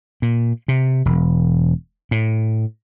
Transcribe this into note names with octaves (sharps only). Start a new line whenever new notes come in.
A#2
C3
E1
A2